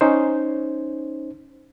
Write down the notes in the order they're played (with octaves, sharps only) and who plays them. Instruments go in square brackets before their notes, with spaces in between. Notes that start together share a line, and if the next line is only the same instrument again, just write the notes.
[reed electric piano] C#4 D#4 C5